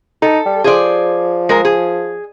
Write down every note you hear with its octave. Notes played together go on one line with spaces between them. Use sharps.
D#4 A4
G3
F3 G#4 C5 D5
G#3 A#4
G#4